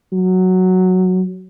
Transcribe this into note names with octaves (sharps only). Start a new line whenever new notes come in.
F#3